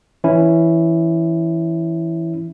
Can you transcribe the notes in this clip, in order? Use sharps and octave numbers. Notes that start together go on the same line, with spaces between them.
E3 C#4 E4